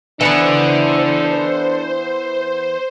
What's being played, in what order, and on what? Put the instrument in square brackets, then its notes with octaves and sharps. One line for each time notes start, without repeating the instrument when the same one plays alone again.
[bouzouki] E3 B3 [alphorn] D4 [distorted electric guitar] A4 F#5 [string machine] C5